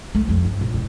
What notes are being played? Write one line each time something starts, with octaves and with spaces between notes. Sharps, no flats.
A3
F2
G1
A#1
E1